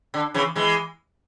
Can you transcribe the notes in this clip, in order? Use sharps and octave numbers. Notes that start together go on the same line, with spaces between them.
D3
C#3 E3
E3 G#3